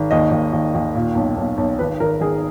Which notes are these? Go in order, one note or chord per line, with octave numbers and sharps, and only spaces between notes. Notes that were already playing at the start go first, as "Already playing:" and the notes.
Already playing: G#1
D#2 D#5
D#2
D#2
D#2
A#2
B1
B1
B1
G#1 B4
G#1 A#4
D#3 G#4